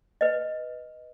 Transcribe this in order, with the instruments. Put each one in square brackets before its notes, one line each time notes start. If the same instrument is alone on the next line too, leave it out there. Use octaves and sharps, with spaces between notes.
[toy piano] B4 D#5